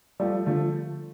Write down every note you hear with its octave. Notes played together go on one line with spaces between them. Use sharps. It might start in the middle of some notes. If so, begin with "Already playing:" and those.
F3 G3 A3
D3 F3 A3